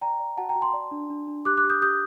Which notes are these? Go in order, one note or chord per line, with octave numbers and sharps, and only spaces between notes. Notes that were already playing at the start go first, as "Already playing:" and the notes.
D5 G5 A#5
D5
F#4 F#5 A5
G5 A#5
F#4
A5 C6
D5
D4
D4
D4
G4 D6 F#6
D6 F#6
G4
D#6 G6
G4 D#6 G6